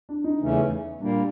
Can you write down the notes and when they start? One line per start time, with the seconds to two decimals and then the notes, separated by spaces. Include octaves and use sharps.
0.09 D4
0.24 D#4
0.40 E2 C#3 E3 A3 C#4
1.01 A#2 G3 A#3 D4